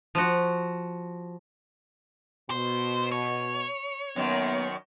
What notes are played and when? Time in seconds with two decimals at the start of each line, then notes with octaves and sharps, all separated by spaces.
0.15 F3 F#4
2.50 B2 C5
3.12 C#5
4.16 F#2 D#3 F#3 A#3 B3